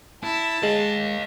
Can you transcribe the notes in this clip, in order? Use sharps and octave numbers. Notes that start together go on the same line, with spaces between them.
E4 A5
G#3 D#5 F5